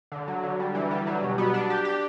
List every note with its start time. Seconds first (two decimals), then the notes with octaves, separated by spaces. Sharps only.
0.12 D3
0.28 F#3
0.43 D3
0.60 G3
0.75 E3
0.91 G3
1.07 F#3
1.22 B2
1.38 B3
1.54 D4
1.70 G4
1.85 G4